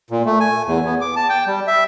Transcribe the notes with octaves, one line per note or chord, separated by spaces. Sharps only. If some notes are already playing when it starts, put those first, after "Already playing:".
A#2
A3
G#5
E2
B3
D6
A5
G5
G3
E5